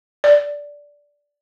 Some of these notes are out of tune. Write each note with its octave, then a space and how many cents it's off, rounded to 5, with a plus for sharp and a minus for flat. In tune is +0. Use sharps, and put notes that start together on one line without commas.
D5 -10